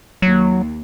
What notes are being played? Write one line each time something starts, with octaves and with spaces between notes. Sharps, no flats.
D#2 F#3